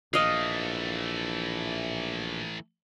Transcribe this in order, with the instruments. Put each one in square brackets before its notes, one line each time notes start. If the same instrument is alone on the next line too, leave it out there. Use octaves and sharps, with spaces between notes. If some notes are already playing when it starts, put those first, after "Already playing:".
[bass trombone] A#1 [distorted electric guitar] E3 A3 [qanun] D#5 F5